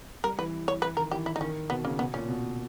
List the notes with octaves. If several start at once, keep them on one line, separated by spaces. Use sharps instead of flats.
G3 A#4
E3 B4
C#5
E3 B4
D#3 A#4
E3 G4
E4
D#4
D#3 C#4
B2 B3
C#3 A#3
B2 B3
A#2 C#4
B2